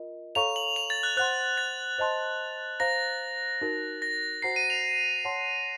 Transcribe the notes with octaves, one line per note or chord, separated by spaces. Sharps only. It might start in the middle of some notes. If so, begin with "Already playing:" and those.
Already playing: F4 A#4 D#5
A4 C#5 F5 A#5 C#6 F7
F#7
F7
A6
F#6
C5 F#5 C6 F#6
A6
C5 D#5 A5 C6
C5 F5 A#5 A#6
D#4 F#4 A#4
A#6
F#4 C5 F#5 A#5 C7
D#7
F7
C#5 F#5 A5 C6